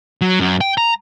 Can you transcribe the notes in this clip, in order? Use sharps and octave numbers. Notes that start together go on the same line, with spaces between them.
F#3
F#2
G5
A#5